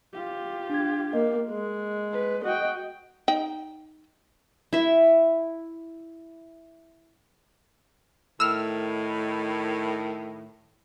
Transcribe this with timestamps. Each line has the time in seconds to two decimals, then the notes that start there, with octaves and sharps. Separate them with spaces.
0.13 F4 G4
0.70 D4 G#6
1.13 A#3 D#5
1.49 G#3
2.12 B4
2.44 F#4 D#5 G5
3.28 D#4 G5
4.73 E4 E5
8.40 A2 D#3 E6 F6